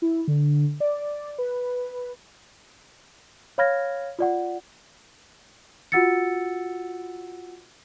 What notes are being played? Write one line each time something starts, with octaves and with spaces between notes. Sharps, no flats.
E4
D3
D5
B4
C#5 F5 B5 F6 G#6 A#6
F4 D5 F#5
F4 F#4 F#5 E6 A6 C#7